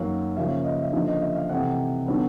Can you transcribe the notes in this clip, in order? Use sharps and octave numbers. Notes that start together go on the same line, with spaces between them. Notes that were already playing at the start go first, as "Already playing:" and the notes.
Already playing: F#2 D#3 F#3 A#3
C#3 F3 A#3 C#4 E5
D#5
E5
D3 F3 A#3 C#4 D#5
D#5
E5
F5
C3 E3 A3 C4 F#5
D3 F#3 B3